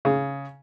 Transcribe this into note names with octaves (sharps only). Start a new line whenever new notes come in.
C#3